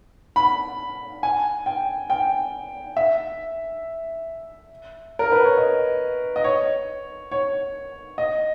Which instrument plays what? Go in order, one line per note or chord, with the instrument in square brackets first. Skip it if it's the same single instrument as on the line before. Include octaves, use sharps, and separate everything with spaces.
[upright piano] B5
G#5
G5
G5
E5
A#4
B4
C#5
D#5
D#5
C#5
C#5
D#5